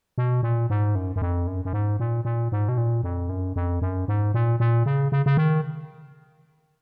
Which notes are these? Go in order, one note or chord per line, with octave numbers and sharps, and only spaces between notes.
B2
A#2
G#2
F#2
F#2
F2
F#2
F#2
G#2
A#2
A#2
G#2
B2
A#2
F2
F#2
F2
F#2
G#2
A#2
A#2
C#3
C#3
C#3
D#3